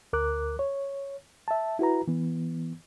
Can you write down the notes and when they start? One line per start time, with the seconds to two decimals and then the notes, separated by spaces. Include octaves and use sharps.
0.13 D2 A#4 D6 F#6
0.59 C#5
1.48 E5 A5
1.79 E4 F#4 B4 A#5
2.08 E3 B3